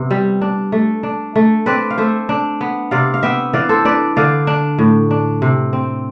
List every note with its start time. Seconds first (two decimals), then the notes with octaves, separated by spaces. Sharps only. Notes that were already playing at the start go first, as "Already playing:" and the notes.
Already playing: C3 B3
0.11 G3
0.42 D4
0.72 A3
1.03 D4
1.36 A3
1.66 C4 B4 D5
1.91 F5
1.98 A3 C5 E5
2.29 D4
2.61 B3
2.91 C3 D5 F5
3.14 F5
3.23 B3 E5 G5
3.53 E3 D5 F5
3.69 A4 C5
3.85 D4 B4 D5
4.16 D3 D5 F5
4.47 D4
4.79 A2
5.11 D4
5.42 C3
5.73 C4